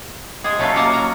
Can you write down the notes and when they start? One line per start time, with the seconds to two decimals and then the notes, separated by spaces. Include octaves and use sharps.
0.44 G#3 G#4
0.59 F#3 A3 C#4 F4 A4 B4
0.76 A#3 F#4 A#4 D#5 F#5 A5
0.93 F#3 F#5 A#5